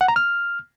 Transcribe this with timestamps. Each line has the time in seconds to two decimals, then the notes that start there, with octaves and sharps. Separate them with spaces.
0.01 F#5
0.08 A#5
0.16 F6